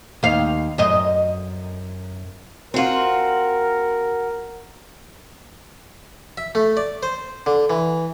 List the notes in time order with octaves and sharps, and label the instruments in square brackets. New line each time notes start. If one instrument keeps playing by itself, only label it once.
[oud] D#2 F5
F#2 D#5
[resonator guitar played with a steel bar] C4 F4 [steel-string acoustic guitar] F#4 F#5 [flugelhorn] A#4
[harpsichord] E5
A3
D5
C5
D3
E3